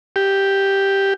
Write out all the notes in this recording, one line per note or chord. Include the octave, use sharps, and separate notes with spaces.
G4